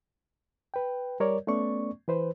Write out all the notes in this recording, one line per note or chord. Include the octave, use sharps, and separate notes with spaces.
B4 G5
G3 A#4 C#5 D5
A3 B3 C#4 D5 C#6
E3 B4 C5